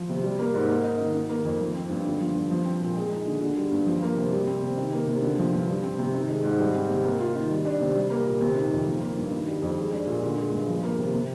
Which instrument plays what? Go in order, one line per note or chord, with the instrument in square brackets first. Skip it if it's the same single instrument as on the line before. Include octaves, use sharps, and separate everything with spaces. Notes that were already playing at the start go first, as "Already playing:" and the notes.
Already playing: [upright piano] F3
C3
G3
A#3
G#2
A#3
D#4
D#3
D#3
A#3
F2
F3
C4
G2
D3
F3
G2
F3
C4
A#2
G#3
D#4
D3
D3
G3
G2
F3
A#3
C3
G3
C4
C3
D#3
A#3
C3
D3
F3
G2
G3
C4
C3
D#3
G#3
G#2
G3
C4
C3
A#3
F4
D#3
G3
D4
C3
G3
A#3
A#2
C3
D#3
F2
F3
A#3
G2
D#3
G3
F2
G#3
D4
A#2
D3
G#3
G2
F3
A#3
C3
C3